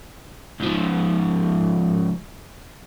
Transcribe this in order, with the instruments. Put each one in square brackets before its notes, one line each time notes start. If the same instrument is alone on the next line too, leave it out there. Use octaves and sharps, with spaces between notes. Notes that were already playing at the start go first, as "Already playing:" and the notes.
[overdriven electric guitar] C#2 F3